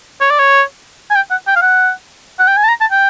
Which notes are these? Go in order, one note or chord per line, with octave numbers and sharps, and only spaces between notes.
C#5
D5
C#5
G#5
G5
F#5
G5
F5
F#5
F#5
G5
G#5
A5
A#5
A5
G5